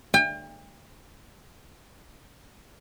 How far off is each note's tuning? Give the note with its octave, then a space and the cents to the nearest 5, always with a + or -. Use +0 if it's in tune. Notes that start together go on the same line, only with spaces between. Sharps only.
G5 +40